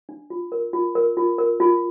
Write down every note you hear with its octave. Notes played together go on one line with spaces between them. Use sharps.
D4
F4
A#4
F4
A#4
F4
A#4
F4